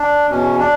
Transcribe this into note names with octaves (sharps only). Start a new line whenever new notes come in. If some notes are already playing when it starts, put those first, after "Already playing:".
Already playing: D4
E2 B2 C#4
D4